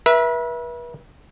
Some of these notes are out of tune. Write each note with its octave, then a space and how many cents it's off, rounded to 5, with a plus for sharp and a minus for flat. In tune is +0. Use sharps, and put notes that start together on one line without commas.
B4 -40 E5 +0